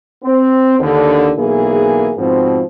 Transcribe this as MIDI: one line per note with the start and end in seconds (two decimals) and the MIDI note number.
0.23 0.79 60
0.80 1.30 39
0.80 1.30 50
1.36 2.11 35
1.36 2.11 52
1.36 2.11 58
1.36 2.11 68
2.17 2.60 44
2.17 2.60 47
2.17 2.60 53
2.17 2.60 60